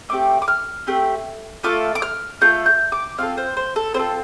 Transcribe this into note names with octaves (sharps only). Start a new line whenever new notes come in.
A3 C4 G4 D6
D6
F6
A3 C4 G4
A3 F4 A4 D6
D6
F6
A3 F4 A4 G6
G6
D6
C4 F4 A4 F5
C5
C5
A4
C4 F4 A4 C5